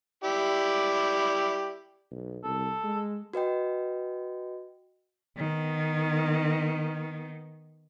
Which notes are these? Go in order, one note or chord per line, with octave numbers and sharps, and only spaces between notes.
E4 G4 D5
B1
C2 A4
G#3
F#4 B4 D#5 G5
D#3 B3